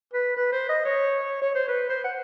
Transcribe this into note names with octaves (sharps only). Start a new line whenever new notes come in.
B4
B4
C5
D#5
C#5
C#5
C5
B4
C5
F#5